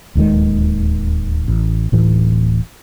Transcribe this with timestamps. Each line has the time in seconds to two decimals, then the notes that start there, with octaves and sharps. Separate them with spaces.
0.15 D1 D#2 D#3 G#3
1.48 A1
1.92 D1 A2 E3